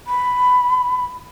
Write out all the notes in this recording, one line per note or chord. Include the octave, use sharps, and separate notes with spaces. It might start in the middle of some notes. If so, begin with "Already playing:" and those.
B5